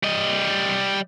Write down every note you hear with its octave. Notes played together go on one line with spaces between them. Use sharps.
G3 D#5